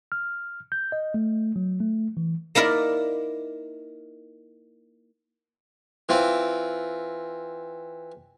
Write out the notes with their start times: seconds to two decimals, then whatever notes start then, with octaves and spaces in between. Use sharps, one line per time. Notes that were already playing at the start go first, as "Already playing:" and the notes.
0.12 F6
0.72 G6
0.92 D#5
1.14 A3
1.56 F#3
1.81 A3
2.17 E3
2.55 A#3 D#4 E4 A#4 D5
6.09 E3 C4 F4